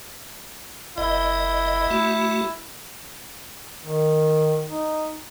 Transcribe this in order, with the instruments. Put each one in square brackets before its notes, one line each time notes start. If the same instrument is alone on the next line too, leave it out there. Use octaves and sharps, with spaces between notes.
[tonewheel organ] F#1 D#5 [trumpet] E4
[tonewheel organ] A3 F#4
[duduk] D#3
D#4